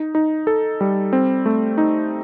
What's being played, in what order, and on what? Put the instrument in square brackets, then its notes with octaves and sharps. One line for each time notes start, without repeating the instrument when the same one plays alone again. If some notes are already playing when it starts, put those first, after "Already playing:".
Already playing: [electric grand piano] D#4
D#4
A4
G3
C4
A3
D#4